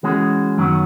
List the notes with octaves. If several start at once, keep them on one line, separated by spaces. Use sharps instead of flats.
E3 G#3 C#4 F#4
F#2 D#3 F#3 B3